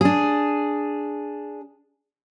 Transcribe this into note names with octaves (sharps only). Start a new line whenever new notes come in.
D4 G#4